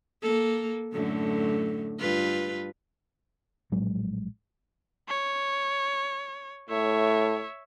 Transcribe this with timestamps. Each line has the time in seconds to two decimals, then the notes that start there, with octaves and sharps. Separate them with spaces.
0.22 A#3 A4
0.93 F#2 A2 D3
1.99 G2 F4 B4
3.72 A#1 A2 F#3 G#3
5.08 C#5
6.70 A2 C#5 E5